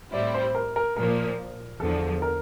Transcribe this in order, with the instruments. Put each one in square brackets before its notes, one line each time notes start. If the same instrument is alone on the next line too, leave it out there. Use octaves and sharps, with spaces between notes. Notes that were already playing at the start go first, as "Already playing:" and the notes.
[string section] A2 G3 C4 E4 [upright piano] D5
[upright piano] C5
A#4
A#4
[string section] A#2 F3 A#3 [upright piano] A#4
[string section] E2 D3 F3 [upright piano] A4
[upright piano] A#4